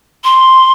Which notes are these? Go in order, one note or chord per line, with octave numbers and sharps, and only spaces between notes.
C6